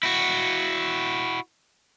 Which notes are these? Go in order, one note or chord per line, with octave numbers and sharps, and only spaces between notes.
E4 F#4